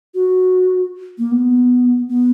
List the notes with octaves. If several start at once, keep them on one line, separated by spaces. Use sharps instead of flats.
F#4
A#3
B3
B3